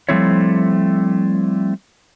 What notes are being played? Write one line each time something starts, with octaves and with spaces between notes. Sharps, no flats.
F3 G3 A3 C4 E4 C#5